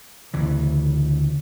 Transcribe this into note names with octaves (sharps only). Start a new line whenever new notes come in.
D2 C#3 E3